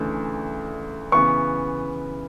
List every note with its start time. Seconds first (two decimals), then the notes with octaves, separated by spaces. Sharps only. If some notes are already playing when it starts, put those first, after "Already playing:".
Already playing: D2 C#3 E3 A3 D4
1.12 C#3 E3 B3 C#6